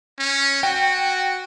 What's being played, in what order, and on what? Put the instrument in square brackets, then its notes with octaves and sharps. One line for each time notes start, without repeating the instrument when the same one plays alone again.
[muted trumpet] C#4
[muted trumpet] F#4 [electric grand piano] G5